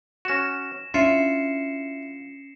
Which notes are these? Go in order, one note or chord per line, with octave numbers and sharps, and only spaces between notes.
C#4 F#4 A#6 E7
C#4 D4 E4 F4 C7 C#7 E7